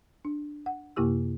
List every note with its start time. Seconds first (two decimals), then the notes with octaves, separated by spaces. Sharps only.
0.25 D4
0.66 F#5
0.96 F#2 C3 A#3 E4 G4 E6